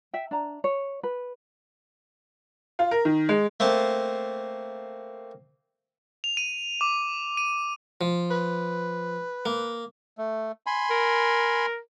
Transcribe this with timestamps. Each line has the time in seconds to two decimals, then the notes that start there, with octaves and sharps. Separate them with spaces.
0.13 E5 G5
0.31 D4 A#5
0.64 C#5
1.03 B4
2.79 F4
2.91 A#4
3.05 D#3
3.29 G#3
3.60 A3 A#3 C4 A5
6.24 F7
6.37 D#7
6.81 D6
7.37 D#7
8.01 F3
8.31 B4
9.46 A#3
10.18 A3
10.66 G#5 B5 C6
10.91 A#4